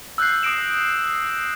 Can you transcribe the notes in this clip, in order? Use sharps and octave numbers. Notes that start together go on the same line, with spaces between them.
E6 F#6 G6 C7
D#6 A#6 D7 E7